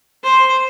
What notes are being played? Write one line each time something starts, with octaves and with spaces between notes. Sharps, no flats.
C5